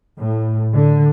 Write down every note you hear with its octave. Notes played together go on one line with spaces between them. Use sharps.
A2
D3